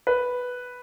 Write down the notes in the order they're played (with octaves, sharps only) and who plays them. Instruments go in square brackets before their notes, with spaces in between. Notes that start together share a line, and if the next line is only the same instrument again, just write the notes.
[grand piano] B4